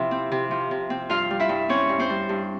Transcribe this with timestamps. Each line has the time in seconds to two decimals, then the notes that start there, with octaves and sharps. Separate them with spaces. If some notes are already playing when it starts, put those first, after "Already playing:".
Already playing: C3 F3 E4 E5
0.11 C4
0.31 C3
0.51 F3
0.71 C3
0.90 C4
1.09 G2 F4 F5
1.30 G3
1.40 E4 E5
1.49 G2
1.69 C4 C#4 C#5
1.89 G2
1.99 C4 C5
2.10 G3
2.29 G2